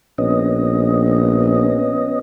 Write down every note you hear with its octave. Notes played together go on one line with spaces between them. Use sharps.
A#1 B3 C#4 D#5